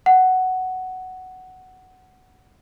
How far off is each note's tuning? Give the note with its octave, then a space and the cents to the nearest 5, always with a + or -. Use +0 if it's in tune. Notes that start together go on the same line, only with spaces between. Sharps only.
F#5 +5